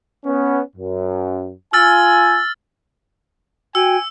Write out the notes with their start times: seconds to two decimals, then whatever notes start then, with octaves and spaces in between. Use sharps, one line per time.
0.24 B3 C#4
0.76 F#2
1.73 F4 G#5 E6 F6 A6
3.75 F#4 G5 G#5 E6